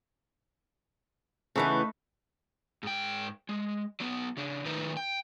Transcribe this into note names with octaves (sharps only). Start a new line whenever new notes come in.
C#3 E3 A3 B3 D#4 B4
G#2 G5
G#3
F#3 B3
C#3 D4
A2 D#3 D#4 B4
G5